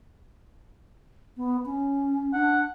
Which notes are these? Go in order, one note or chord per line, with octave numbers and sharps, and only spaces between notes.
B3
C#4
D4 F#5